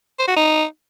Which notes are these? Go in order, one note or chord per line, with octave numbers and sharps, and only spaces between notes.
C5
F#4
D#4